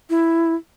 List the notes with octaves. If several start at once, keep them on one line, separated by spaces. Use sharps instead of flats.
E4